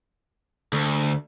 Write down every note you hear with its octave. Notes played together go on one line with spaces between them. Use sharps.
D2